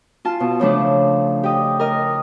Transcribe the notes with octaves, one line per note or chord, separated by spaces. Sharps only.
F4 A5
B2
C#3 F3 A3 D4
G4 D#5
A#4 D#5